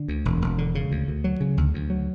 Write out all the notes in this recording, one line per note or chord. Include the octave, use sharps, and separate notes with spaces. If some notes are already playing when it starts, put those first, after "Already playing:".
Already playing: D3
D2
E1
E1
D3
C#3
D2
D2
F#3
C#3
D2
D2
F#3